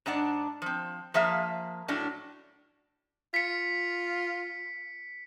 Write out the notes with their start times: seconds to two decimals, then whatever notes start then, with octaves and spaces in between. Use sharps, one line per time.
0.06 G#2 D4 D5 F#5
0.62 F3 C4
1.14 F3 A#3 G#4 E5 F5
1.88 A2 F#3 C#4 D4 F#4
3.34 F4 B6 C#7